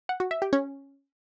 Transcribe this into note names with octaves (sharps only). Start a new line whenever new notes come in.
F#5
F#4
E5
G4
C#4